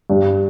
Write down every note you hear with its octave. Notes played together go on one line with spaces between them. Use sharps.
G2